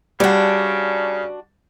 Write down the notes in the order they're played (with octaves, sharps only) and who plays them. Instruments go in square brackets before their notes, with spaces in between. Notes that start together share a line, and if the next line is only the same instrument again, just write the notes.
[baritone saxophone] C#3 [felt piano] G3 [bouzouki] D4 F#4